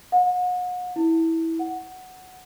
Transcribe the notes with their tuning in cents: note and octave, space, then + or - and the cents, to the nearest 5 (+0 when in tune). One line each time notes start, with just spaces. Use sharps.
F#5 -40
E4 -15
F#5 +0